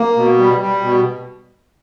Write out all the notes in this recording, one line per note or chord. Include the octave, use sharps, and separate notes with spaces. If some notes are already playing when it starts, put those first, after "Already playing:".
Already playing: A#3
B2
G3
G3
B2